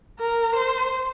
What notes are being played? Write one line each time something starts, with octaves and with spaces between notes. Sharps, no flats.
A#4
C5